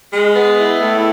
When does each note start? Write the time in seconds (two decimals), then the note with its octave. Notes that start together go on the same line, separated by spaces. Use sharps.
0.12 G#3
0.35 B3
0.58 E4
0.80 A2